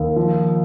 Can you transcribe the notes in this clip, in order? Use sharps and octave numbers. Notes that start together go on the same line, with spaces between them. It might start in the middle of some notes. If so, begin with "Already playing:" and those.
Already playing: D#2
F3